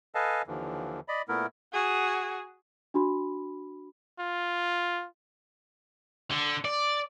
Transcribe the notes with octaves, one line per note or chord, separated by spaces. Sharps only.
A4 B4 D#5 F5 G#5 A5
D#2 D3 E3 F3
D5 D#5 B5
A#2 A3 B3 E4 A#4
F#4 G#4
D4 F#4 B5
F4
D3
D5